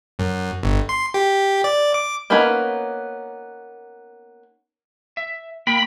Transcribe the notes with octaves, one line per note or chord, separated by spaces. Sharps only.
F#2
G1
C6
G4
D5
D6
A#3 B3 C#4 D#4 B5
E5
A#3 G5 B5